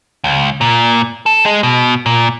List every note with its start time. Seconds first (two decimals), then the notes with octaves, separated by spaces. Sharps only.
0.24 C#2
0.61 A#2
1.26 A4
1.46 G#3
1.63 B2
2.06 A#2